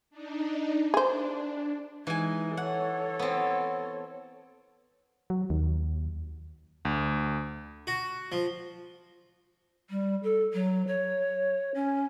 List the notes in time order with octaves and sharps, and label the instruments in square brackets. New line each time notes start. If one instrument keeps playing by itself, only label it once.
[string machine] D4 D#4
[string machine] D4 [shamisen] G#4 C5
[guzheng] E3 G#5 [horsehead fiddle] G#3 D#4
[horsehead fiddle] A4 C#5 [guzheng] F#5
[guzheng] B3 C4
[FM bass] F#3
D#2
[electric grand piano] D2
[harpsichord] F#4
F3
[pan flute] G3
A4
F#3
C#5
C#4